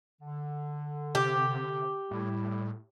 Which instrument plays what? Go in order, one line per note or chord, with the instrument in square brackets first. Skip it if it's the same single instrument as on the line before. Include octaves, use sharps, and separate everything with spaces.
[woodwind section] D3
[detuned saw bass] C3 [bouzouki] G4
[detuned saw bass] A2 [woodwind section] G3 E4